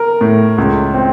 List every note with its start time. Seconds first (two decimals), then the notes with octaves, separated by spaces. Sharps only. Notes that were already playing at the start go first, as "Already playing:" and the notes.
Already playing: A#4
0.21 A2
0.58 C#2
0.94 C4